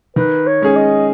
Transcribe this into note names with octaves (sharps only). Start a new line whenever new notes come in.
D#3 B4
C#5
G#3 C#4 G#4
D#5